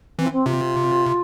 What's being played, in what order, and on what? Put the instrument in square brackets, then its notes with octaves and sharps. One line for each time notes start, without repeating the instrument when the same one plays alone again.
[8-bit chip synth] E3 [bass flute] C4
[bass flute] C4
[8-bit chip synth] C3 [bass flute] F4